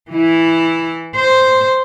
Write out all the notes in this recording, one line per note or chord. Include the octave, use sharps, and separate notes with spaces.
E3 E4
C5